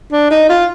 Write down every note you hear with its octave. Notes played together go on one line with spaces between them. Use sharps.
D4
D#4
F4